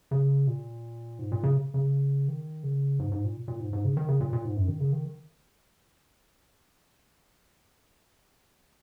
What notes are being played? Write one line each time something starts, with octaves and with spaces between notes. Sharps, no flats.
C#3
A#2
G#2
A#2
C#3
C#3
D#3
C#3
G#2
G#2
A#2
A#2
G#2
G#2
C#3
D#3
C#3
A#2
A#2
G#2
F#2
D#3
C#3
D#3